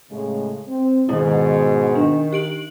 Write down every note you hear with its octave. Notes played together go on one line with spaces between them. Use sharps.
A2 C#3 G#3
C4
G#2 B2 D#3 E4
D#3 D4
G4 D7 F#7